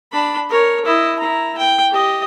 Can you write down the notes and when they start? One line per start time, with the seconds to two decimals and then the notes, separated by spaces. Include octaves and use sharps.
0.12 D4 B5
0.50 A#4 C#5
0.86 E4 D#5
1.19 E4 A#5
1.58 G5
1.91 G4 D#5